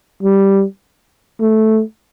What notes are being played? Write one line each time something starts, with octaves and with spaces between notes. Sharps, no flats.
G3
A3